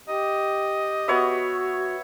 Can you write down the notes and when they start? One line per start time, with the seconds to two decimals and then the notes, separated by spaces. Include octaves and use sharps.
0.09 G4 D#5
1.08 B3 F#4 C#5 E5